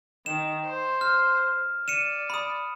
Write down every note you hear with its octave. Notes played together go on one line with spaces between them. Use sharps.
D#3 E7
C5
F6
D5 C#7 D#7 E7
B5 D#6